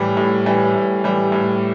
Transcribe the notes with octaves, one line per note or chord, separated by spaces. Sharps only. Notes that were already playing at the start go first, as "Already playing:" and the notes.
Already playing: A2 E3 G3
A2
E3 G3
A2
E3 G3
A2